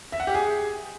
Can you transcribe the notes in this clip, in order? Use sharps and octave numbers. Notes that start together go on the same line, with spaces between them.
E5
F#5
G4
G#4